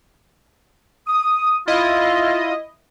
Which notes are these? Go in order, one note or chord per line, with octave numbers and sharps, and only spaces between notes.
D#6
E4 F4 D#5